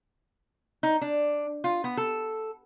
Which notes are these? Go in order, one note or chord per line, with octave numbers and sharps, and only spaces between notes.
D#4
D4
F4
B3
A4